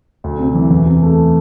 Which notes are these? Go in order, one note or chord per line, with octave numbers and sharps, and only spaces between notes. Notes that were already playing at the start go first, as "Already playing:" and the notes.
D2
C3
E3
E2
C3
A3